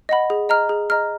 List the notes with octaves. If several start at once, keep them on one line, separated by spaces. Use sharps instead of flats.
D#5 F#5 B5
G#4
D#5 A#5 F6
G#4
D#5 A#5 F6